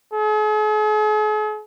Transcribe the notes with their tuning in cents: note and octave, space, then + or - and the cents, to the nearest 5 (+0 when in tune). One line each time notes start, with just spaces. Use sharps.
G#4 +45